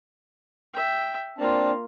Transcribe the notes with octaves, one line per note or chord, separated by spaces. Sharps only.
E5 G5
A#3 C4 D4 F4 A5